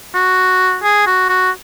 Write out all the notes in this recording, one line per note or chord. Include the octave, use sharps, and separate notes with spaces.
F#4
G#4
F#4
F#4